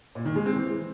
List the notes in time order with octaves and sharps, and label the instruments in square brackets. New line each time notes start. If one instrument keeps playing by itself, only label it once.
[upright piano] A#2
D#3
G#3
C4
E3